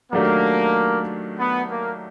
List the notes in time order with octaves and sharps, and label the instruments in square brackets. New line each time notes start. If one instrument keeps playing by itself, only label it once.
[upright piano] D#3 F#3 A3 D4 G4 [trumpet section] A#3
[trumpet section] B3
A#3